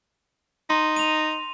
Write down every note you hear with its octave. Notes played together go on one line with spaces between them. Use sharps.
D#4 C6
D#7 F7